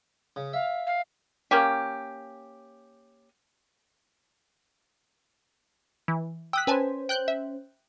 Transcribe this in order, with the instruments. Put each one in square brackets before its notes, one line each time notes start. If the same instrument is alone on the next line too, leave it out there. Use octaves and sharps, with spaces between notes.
[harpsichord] C#3
[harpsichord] E5 [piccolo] F5
[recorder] F5
[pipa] A#3 C#4 G4
[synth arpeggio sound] E3
[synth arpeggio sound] G5 D#6 B6 [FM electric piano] E6 F#6
[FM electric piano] C#4 C5 [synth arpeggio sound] B4 G#5 A5
[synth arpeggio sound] G5 F#6 G6
E5